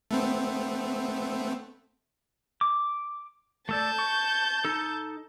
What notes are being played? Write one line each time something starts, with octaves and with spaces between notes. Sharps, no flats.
A3 B3 C4
D6
A3 A4 D5 A5 G6
C#6
D#4 A4